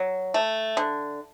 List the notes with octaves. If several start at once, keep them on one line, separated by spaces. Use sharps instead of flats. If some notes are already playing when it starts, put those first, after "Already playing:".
Already playing: F#3
A3
D3